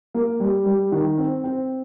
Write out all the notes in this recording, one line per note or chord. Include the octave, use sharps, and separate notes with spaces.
A#3
G3
G3
D#3
C4
C4